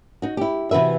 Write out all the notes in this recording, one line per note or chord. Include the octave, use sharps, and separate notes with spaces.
D#4 F#4
E4 G4
C3 E3 F#4 B4 E5